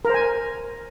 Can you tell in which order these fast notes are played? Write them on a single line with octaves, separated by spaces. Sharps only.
A#4 C5 G#5